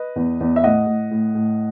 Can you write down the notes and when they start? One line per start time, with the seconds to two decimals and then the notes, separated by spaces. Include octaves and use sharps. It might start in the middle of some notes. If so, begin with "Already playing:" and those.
Already playing: B4 D#5
0.16 E2
0.40 E2
0.56 E5
0.64 A2 D#5 F#5
0.87 A2
1.11 A2
1.35 A2